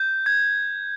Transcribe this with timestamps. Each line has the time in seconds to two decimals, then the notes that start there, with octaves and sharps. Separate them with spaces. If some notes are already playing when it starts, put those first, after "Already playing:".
Already playing: G6
0.26 G#6